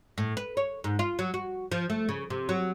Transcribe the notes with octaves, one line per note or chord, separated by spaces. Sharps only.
A2
B4
C#5
G#2
F4
F#3
F#4
F3
A3
C#3
C3
F#3